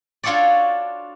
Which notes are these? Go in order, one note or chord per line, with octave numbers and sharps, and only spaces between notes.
D4 F4 F#4 A4 C#5 D5